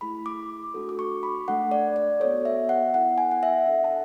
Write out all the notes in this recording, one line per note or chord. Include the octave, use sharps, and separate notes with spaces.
A3 E4 G#4 B5
D6
A3 D4 F#4 A4
D6
C#6
B5
A3 D4 A4 F#5
D5
D5
B3 F#4 A4 C#5
E5
F#5
B3 E4 A4 F#5
G#5
F#5
E5
D4 A4 F#5
A5